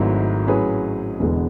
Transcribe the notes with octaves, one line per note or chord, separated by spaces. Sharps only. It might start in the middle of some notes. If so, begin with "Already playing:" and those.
Already playing: G#1 G#2 F#3 A3 E4
A2 F#3 C#4 G#4 B4
E1 E2 D3 G#3 B3